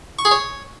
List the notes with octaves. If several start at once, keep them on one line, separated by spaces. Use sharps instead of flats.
C#6
G#4
C#5